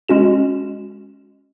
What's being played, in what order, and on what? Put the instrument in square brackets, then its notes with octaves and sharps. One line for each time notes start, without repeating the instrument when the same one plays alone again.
[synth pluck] G#3 C#4 F#4 E7